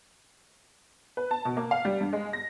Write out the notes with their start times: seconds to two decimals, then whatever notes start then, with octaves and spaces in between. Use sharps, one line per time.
1.17 B4
1.31 A5
1.45 B2
1.57 A#3
1.71 F5
1.85 G3
2.01 G2
2.13 G#3
2.33 A#6